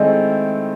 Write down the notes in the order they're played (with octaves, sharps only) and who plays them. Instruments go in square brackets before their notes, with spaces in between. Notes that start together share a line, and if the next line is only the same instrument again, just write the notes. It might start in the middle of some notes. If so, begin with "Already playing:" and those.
Already playing: [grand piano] D#3 A3 C4 E4 [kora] G#3